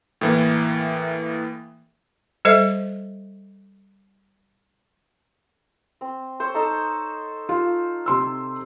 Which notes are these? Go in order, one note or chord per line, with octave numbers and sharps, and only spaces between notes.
A2 E3 A#3
G3 A4 C5 D#5 E5
C4
C5 C#5 E6
D#4 A4 A#5
F4
C3 C6 E6